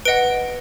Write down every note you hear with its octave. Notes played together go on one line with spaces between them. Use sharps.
B4 D#5 F#5 D7